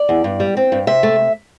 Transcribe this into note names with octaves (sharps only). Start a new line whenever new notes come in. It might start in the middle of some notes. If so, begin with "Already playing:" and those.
Already playing: D5
E2
G2
G3
C4
G2
C3 E5
A3